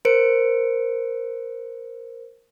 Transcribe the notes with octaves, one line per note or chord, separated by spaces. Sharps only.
A#4 C5 C#7 D7